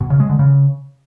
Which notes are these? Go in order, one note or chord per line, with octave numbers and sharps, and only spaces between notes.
B2
C#3
G#3
D3
C#3